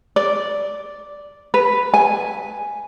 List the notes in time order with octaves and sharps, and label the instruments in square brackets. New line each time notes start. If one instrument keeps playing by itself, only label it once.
[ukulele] D5
B4
G#5